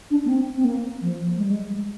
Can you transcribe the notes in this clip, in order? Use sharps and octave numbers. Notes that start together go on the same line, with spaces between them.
D4
A#3
C4
C4
A#3
F3
G#3
G3
G#3
G#3